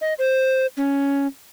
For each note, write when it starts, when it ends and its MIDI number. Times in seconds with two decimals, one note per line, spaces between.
0.01 0.14 75
0.19 0.66 72
0.77 1.27 61